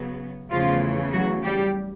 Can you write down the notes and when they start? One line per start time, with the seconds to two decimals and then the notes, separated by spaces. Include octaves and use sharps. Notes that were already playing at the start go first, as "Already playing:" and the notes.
Already playing: C#3 F#3 B3
0.51 E2 C#3 E3 F3 A3 F4
1.13 F#3 F#4
1.44 G3 G4